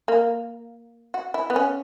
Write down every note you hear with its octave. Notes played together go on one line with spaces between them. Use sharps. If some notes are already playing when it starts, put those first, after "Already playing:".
A#3
F#4
E4
B3
C#4